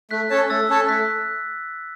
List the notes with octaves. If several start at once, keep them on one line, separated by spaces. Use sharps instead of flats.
A3 F#6 B6
C#4 A4 C#5 A5
A3 E6 A6
C#4 A4 C#5 A5
A3 F#6 B6